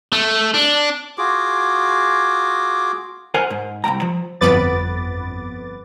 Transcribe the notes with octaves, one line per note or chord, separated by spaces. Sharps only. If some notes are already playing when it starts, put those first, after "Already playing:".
A3
D4
F4 F#4 G#4 D6
A#4 C5 F#5 G#5
G#2
C2 A3 G5 A#5
F3
G1 F2 B3 B4 D6 A6